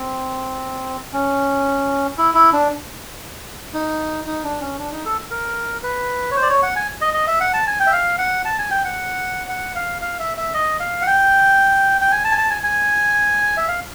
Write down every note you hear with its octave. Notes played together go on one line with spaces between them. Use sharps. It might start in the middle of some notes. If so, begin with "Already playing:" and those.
Already playing: C4
C#4
E4
E4
D4
D#4
D#4
D4
C#4
D4
D#4
A4
A#4
B4
C#5
C5
D5
C#5
F#5
G#5
D#5
D#5
E5
F#5
A5
G#5
G5
E5
F5
F#5
A5
G#5
G5
F#5
F#5
F5
F5
E5
E5
D#5
F5
F#5
G5
G5
G#5
A5
G#5
A5
G#5
G#5
E5
F5